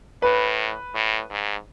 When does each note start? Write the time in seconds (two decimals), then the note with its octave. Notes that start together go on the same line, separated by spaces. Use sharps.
0.22 A2 B4
0.95 A2
1.30 G#2